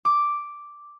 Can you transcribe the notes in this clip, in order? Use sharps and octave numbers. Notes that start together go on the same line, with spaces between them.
D6